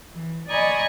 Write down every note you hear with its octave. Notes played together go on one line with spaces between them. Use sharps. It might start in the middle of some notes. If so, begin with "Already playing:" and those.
E3
D5 D#5 G#5 A#5 B5 C#6